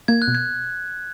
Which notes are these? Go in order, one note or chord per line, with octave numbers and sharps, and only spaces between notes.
A#3 G#6
F#6
B2
G#6